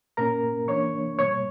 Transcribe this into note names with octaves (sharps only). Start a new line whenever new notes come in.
A#2 A#3 C#4 A#4 A#5
E3 A#3 D4 C#5 C#6
B2 G3 A#3 C#5 C#6